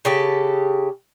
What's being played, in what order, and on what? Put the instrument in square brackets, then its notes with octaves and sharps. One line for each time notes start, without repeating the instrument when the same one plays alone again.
[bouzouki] C#3 G4 A4